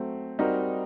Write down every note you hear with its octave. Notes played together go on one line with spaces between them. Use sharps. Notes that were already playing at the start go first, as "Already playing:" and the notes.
Already playing: F#3 A3 C4
G3 C4 D#4 F#4 A#4